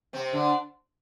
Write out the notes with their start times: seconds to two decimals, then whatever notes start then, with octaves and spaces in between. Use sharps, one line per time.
0.13 C3 C4
0.33 D3 D4